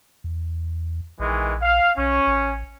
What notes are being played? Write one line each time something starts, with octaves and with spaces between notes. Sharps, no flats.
E2
A#1 D#3 E3 G#3
F5
B1 C#4
A1